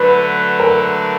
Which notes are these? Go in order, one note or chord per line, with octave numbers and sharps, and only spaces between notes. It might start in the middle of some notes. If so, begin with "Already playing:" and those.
Already playing: D3 F#3 A3 D4 B4
A#4